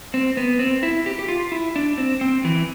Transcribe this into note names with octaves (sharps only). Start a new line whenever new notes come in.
C4
B3
C4
E4
G4
G4
F4
E4
D4
C4
C4
E3